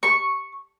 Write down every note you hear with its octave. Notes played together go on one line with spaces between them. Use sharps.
C#6